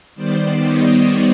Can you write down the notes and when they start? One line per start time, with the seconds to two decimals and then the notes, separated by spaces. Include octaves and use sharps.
0.15 D#3 G3 B3 C5 D5
0.60 C#5 D#5